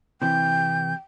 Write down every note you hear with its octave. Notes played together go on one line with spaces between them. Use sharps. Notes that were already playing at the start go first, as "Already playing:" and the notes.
C3 E3 G5 G6